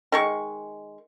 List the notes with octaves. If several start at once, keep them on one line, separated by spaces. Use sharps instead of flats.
D#3 G#3 C#6